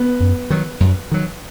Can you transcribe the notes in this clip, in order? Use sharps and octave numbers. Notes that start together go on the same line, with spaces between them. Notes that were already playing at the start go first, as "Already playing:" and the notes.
Already playing: B3
F#2
D#3 F#3
F#2
D#3 F#3